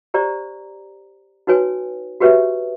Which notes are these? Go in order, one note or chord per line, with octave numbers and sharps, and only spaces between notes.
G4 C5 D5 A#5
D#4 F#4 B4 C#5 G#5
F#4 G4 B4 C#5 E5